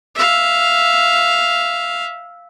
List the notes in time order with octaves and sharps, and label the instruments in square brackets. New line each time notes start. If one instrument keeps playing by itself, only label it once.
[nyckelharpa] E5 F5